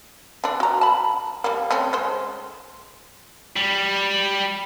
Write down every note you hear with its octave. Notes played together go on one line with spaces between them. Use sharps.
D3 D4
F#4 A#5
A5 B5
G3 A#3
A3 C4 C#4
G#3 C5
G3